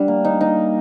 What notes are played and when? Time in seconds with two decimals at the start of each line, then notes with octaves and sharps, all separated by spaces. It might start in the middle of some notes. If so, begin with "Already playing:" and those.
Already playing: G3 D4
0.08 A#3
0.25 D#4
0.41 D#4